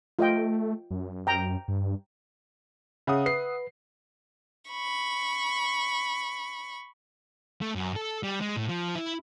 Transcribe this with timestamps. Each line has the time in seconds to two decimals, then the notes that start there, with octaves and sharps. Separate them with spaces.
0.19 A3 F4 D#5 G5
0.91 F#2
1.27 G5 A#5
1.68 G2
3.07 C#3 E5 F#5 D#6
3.26 B4 C7
4.69 B5 C#6
7.61 A3
7.75 F#2
7.96 A4
8.23 G3
8.41 G#3
8.57 A2
8.69 F3
8.95 E4